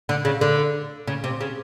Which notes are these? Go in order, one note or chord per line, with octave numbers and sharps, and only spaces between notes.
D3
C#3
D3
C#3
C3
C#3